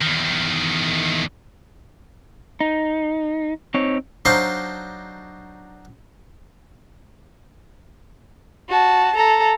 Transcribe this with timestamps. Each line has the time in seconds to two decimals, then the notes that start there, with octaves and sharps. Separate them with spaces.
0.02 E2 D#3
2.60 D#4
3.74 C4 D#4 C#5
4.25 F#3 D4 D#4 C5 F5
8.69 F#4 A5
9.16 A4 A#5